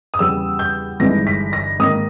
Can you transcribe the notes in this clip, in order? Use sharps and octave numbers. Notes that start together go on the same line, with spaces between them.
D#6
E2 C#3 G3 B3 E6
G6
G1 G2 E3 G#3 D#4 A#6
B6
A#6
G#2 D#3 A#3 D#4 D#6